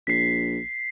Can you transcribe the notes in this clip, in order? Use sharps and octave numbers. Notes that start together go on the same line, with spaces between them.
A#1 B6 C7